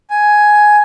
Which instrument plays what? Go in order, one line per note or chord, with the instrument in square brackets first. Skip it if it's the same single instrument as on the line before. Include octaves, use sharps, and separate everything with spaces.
[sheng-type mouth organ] G#5